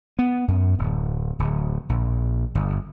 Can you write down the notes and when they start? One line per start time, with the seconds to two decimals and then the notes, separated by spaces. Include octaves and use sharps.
0.19 B3
0.48 F#2
0.78 D1
1.39 D1
1.89 A#1
2.55 G1